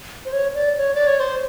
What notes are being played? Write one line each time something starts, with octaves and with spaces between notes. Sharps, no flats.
C5
C#5
D5
C#5
D5
C#5
C5